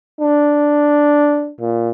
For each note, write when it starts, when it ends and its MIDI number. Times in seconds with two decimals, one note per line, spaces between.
0.21 1.51 62
1.61 1.91 46